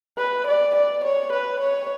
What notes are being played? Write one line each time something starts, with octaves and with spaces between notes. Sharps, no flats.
B4
D5
D5
C#5
B4
C#5